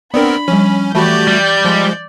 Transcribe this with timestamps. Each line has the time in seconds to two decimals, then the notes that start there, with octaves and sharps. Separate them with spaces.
0.14 B3 C4 D4 A#4 D5 B5
0.48 F3 G3 C#4
0.95 E3 A3 F#4 G4 D5 A5 B5 G6
1.28 G3
1.65 F3 G#3